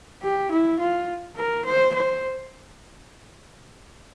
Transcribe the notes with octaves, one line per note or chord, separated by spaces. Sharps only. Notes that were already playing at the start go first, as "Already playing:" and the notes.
G4
E4
F4
A#4
C5
C5